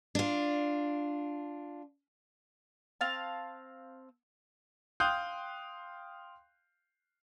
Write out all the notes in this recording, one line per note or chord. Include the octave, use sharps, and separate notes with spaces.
D4 F4
C4 F5 A5
F5 G5 C6 D#6 F#6 G6